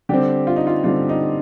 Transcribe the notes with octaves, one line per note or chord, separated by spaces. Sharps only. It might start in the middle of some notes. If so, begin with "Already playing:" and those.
D3 G3 C4 G4
F4
D#4
F4
D3 G3 C4 F4
D#4